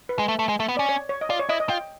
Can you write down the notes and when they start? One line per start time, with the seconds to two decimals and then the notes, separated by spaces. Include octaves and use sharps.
0.09 B4
0.19 G#3
0.28 A3
0.39 A3
0.49 G#3
0.60 A3
0.69 B3
0.77 C#4 D5
0.89 C#5
1.09 C#5
1.21 D#5
1.30 F4 D5
1.39 C#5
1.49 E4 D#5
1.60 D#5
1.69 F4 G5